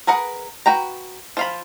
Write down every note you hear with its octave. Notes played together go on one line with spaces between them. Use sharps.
G#4 A#4 B4 F#5
F#4 B4 G5 A#5
F3 F5 B5